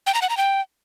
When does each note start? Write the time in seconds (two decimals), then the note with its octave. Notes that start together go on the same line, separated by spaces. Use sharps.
0.07 G5
0.14 A#5
0.22 F#5
0.30 A#5
0.37 G5